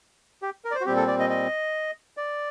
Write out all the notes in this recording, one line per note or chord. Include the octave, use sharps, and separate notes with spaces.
G4
A#4
D5
C5
F#4
A#2 G3 C4 G4
A4
D5
D#5
D#5
D5